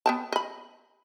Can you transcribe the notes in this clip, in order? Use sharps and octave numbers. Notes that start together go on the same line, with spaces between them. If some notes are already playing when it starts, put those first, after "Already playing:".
B3 G5 A5
D#5 B5